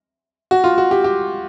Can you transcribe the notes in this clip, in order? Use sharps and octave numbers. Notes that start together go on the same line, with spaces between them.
F#4
F4
F#4
G4
G4